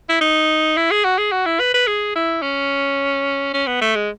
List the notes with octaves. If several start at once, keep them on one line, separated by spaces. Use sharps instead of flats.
E4
D#4
E4
G#4
F#4
G#4
F#4
E4
B4
B4
G#4
E4
C#4
C#4
B3
A3
G#3